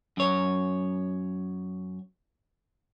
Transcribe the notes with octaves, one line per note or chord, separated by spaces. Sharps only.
F#2 C#5